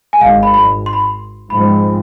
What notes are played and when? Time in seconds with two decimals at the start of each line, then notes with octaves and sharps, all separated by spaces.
0.13 G#5
0.21 G#1 G#2 G#3 F5
0.43 B5
0.54 B5
0.86 C6
0.93 B5
1.00 C6
1.50 G#2 F3 G#3 C4 B5